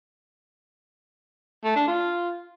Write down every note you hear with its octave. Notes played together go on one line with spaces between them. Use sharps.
A3
D4
F4